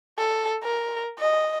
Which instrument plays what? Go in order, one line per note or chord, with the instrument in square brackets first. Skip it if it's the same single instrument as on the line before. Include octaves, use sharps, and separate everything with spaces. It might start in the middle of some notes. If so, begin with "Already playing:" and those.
[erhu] A4
A#4
D#5